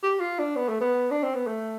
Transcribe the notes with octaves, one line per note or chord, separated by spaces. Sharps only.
G4
F4
D4
B3
A3
B3
D4
C4
B3
A3